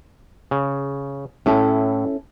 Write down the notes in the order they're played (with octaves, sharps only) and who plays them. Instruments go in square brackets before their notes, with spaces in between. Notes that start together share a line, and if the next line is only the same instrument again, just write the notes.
[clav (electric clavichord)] C#3
[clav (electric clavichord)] A2 [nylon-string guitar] C#4 E4 A4